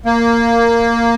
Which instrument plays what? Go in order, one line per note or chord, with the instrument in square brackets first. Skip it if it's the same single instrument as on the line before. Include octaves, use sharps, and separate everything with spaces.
[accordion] A#3